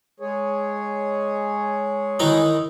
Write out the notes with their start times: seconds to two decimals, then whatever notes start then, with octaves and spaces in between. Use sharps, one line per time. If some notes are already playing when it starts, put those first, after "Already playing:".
0.20 G#3 G#4 C#5
2.20 D#3 E3 D#4